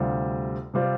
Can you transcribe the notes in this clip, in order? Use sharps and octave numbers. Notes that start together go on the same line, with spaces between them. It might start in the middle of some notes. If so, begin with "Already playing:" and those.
Already playing: D2 C3 G3 C4 F4
C3 G3 C4 F4